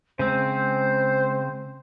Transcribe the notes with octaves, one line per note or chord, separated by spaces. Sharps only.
C#3 G#3 C4 C5